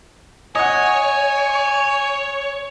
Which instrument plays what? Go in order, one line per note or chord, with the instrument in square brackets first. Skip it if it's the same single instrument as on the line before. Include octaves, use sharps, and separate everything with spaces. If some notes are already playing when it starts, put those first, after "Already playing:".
[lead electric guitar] C#5 [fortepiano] D#5 F#5 [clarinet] G#5